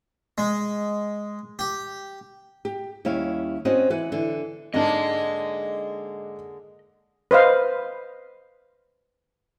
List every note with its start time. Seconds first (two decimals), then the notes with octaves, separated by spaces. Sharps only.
0.38 G#3
1.59 G4
2.65 G4
3.05 D#2 G3 C#4 E4 F5
3.65 C4 C#4 F#4 D#5 F#5
3.90 E3 B4 F#5
4.12 D3 E3
4.74 G#2 D3 G#3 A#3 D4 D#5
7.31 B4 C5 D#5 F5